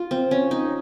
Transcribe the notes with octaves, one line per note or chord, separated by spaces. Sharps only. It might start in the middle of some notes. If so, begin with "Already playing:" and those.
Already playing: F4
C4
C#4
D#4